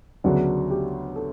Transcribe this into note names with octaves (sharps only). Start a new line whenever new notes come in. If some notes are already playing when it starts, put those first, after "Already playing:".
D2 C#3 F#3 B3 D4 F#4
G4
A4